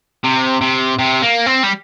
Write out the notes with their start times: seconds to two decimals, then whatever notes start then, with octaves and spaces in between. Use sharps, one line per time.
0.24 C3
0.61 C3
0.99 C3
1.23 A#3
1.47 C4
1.64 G3